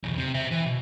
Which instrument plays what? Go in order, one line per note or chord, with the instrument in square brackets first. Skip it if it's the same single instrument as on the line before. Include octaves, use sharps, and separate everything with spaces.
[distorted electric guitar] B1 E2
C3
C5 E5
E3
B2